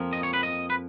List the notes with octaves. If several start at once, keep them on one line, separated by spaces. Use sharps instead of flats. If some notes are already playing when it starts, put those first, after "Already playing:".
Already playing: F2 F3 A#3
D#5
C#5
B4
D#5
B4